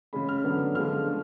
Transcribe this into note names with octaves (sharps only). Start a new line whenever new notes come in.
C#3 G#3 C#4 B5
F6
D3 F#3 B3 D4
D3 F3 G#3 D4 F6
A3